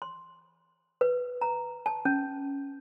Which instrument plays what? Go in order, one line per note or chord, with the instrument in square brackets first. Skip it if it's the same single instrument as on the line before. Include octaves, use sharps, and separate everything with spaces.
[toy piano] C6
B4
A#5
A5
C#4